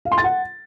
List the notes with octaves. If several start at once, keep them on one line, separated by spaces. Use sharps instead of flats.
F5
C6
A6
F#5